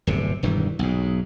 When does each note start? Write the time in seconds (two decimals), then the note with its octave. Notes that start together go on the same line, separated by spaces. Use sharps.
0.07 D1 G1 C3
0.43 E1 G2 D#3 E3
0.79 B1 G#2